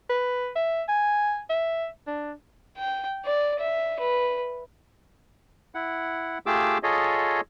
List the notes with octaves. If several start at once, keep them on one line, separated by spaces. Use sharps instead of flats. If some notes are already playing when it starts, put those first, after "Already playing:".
B4
E5
G#5
E5
D4
G5
D5
E5
B4
E4 F#5
A3 F4 G4 G#4 D6 E6
F4 G#4 A4 C#5 D#5